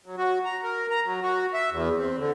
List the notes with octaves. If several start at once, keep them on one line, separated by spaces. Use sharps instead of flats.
F#3
F#4
A#5
A#4
A#5
F#3
F#4
E5
E2
C4
D3